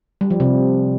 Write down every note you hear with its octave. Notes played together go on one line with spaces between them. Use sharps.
G3
F3
C3